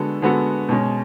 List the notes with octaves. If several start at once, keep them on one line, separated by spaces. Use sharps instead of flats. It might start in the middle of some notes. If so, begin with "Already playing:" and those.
Already playing: D3 G#3 B3 F#4 A4
D3 G#3 B3 F#4 A4
B2 G#3 C#4